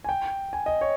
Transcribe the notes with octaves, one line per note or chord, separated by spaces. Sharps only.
G#5
G5
G#5
D#5
C#5